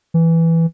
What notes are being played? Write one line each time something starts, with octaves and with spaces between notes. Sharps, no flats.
E3